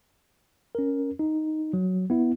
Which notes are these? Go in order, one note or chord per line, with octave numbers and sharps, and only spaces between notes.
C#4 A#4
D#4
F#3
B3 E4